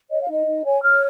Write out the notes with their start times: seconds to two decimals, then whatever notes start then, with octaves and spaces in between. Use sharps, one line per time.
0.11 C#5 D#5
0.22 F5
0.29 D#4 D#5
0.47 D#4
0.65 C#5 G#5
0.82 C#5 F6